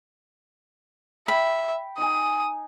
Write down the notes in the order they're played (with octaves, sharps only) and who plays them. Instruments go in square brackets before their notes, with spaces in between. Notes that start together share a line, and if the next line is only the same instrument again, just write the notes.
[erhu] E5 [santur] G5 [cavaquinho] B5
[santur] D#4 G#5 [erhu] D#6